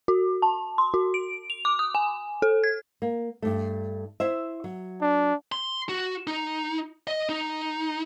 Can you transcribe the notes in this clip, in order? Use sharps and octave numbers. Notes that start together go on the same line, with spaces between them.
F#4
A5
C6
F#4
D7
F7
D6
D#6
G#5
A4
G#6
A#3
G2 A3
E4 C5 E5
F#3
D4
C6
F#4
D#4
D#5
D#4